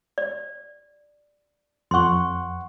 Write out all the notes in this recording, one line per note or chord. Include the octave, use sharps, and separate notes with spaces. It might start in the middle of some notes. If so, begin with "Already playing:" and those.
D5
F2 F#5 C6 C#6